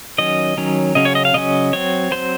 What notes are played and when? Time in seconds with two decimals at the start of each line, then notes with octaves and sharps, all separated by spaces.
0.18 D#3 F#3 C#4 D#5
0.57 D#3 F#3 C#4
0.95 C#3 F#3 C#4 D#5
1.05 C#5
1.15 D#5
1.25 F5
1.34 C#3 F#3 C#4 D#5
1.73 F#3 C4 C#5
2.11 F#3 C4 C5